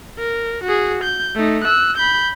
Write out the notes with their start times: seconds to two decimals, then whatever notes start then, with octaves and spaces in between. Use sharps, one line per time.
0.19 A#4
0.64 F#4 G#4
1.04 G6
1.35 A3 D#4
1.64 E6 F#6
1.97 B5 G6